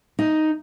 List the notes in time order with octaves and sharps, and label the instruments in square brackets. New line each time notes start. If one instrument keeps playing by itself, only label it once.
[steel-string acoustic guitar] D#4